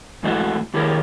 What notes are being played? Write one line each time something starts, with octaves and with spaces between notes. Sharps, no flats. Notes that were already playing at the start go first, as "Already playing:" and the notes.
G#2 E3 A3 D#4 E4 F#4
D#3 E4 G4 G#4 A#4 C#5